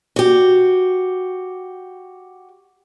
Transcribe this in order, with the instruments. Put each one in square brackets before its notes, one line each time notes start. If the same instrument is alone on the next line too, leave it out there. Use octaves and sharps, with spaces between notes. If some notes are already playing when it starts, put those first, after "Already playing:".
[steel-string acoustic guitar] F#4 G4